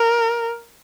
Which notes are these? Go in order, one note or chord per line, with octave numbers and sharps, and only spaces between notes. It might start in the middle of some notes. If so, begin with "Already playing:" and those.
Already playing: A#4